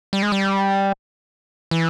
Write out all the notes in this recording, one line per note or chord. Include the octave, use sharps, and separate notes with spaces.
G3
G#3
G3
E3